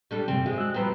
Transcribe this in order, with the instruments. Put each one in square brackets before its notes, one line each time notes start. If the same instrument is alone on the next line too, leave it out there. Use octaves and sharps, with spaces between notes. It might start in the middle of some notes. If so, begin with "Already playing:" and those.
[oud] G3 D4 A4
[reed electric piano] G2 C3 G3 [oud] C4
[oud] G#3 [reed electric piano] F#4
[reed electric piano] E6 F#6
[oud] F3 B3 C4 [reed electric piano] G3 A#5